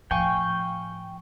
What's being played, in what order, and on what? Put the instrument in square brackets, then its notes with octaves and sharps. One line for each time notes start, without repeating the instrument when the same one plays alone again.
[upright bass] A2 F3 [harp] F5 G#5 C#6 [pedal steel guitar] G5